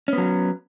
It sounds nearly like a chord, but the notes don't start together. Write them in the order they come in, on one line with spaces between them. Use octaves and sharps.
C#4 B3 F#3